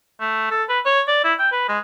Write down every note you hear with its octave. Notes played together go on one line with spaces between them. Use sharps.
A3
A4
B4
C#5
D5
E4
G5
B4
G#3